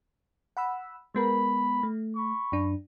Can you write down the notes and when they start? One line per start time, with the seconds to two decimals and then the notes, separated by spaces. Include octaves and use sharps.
0.57 F#5 B5 E6
1.15 G#3 B3 A#4 B5
1.83 A3
2.16 B5 C#6
2.52 F#2 D4